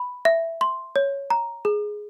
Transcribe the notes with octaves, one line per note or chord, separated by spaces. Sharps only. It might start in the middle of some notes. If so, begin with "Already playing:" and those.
Already playing: B5
E5
C6
C#5
A#5
G#4